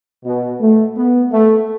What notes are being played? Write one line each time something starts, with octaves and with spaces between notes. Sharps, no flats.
B2
A3
B3
A3